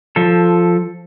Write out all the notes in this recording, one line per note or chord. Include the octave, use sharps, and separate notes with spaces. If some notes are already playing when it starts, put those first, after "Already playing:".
F3 A4